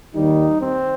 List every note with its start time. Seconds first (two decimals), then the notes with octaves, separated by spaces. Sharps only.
0.15 D#2 D#3 G3 D#4
0.60 C4